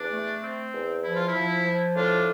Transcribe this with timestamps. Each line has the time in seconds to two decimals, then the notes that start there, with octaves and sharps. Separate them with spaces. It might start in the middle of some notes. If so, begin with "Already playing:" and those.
Already playing: E2 D4
0.10 A3
0.42 C4
0.73 E2
1.03 F3 E4
1.16 F4
1.29 E4
1.34 F3
1.65 F3
1.96 A2 D4 F4